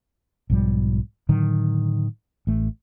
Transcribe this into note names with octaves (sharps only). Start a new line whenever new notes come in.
B1 G#2 F3 G3
A2 D3 D#3 F#3
A1 A3